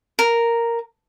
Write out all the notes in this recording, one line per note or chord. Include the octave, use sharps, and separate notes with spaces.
A#4